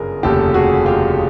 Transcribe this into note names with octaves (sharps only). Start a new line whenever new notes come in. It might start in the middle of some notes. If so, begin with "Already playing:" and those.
Already playing: G1 F#2 C#3 G#4 A#4
F1 D#2 C#3 G4 A4
F#4 G#4
F4 G4